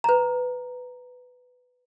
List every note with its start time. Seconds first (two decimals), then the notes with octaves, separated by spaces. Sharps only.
0.04 B4 A#5